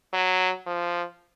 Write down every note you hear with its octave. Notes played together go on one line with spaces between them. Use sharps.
F#3
F3